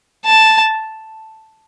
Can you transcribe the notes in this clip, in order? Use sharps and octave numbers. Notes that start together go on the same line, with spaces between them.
A5